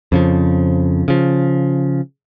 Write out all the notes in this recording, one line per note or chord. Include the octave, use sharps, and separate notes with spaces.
F2 C#3 F3
C#3 F3